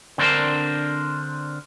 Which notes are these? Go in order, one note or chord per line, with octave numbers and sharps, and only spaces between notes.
D3 C4 D4 A#4 C5